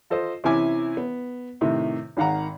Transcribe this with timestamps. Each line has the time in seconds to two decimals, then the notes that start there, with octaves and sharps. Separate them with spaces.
0.10 F4 A4 C5 D#5
0.44 C3 E3 C#4 E4 G#5 D6
0.97 B3
1.61 A2 C3 D#3
2.17 G#1 D#3 F5 F#5 A#5